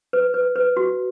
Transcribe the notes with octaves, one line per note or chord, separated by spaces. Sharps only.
B4
B4
B4
F#4